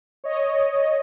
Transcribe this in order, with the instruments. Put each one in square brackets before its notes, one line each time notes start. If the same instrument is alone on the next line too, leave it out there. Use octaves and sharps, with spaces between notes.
[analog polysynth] C#5 D#5